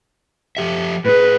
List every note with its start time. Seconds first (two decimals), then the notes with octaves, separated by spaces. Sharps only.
0.57 F3 G4 E5
1.05 A2 G#4 B4